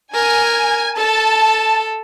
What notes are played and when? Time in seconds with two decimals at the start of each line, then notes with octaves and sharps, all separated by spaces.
0.14 A#4 G#5
0.97 A4 A5